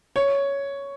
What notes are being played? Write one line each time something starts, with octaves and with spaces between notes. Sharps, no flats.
C#5